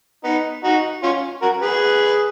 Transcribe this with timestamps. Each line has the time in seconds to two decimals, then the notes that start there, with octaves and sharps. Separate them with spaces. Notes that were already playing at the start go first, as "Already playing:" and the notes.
0.24 B3 D#4
0.64 D#4 F#4
1.03 C#4 F4
1.42 F#4 A#4
1.61 G#4 B4